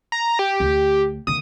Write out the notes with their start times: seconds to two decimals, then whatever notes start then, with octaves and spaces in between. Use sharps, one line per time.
0.12 A#5
0.39 G4
0.60 D2
1.27 D#2 D3 D#6